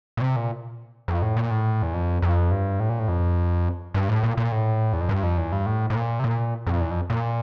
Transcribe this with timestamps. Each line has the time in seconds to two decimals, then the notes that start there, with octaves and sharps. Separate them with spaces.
0.17 A#2
0.21 C3
0.36 A#2
1.08 F2
1.22 A2
1.36 A#2
1.51 A2
1.82 E2
1.94 F2
2.22 F2
2.51 G2
2.80 A2
2.90 A#2
2.99 A2
3.08 F2
3.94 G2
4.09 A2
4.23 A#2
4.37 A#2
4.52 A2
4.93 E2
5.01 F2
5.09 G2
5.23 F2
5.38 E2
5.52 G2
5.66 A2
5.90 A2
5.95 A#2
6.19 C3
6.24 A#2
6.67 F2
6.81 E2
6.91 F2
7.10 A#2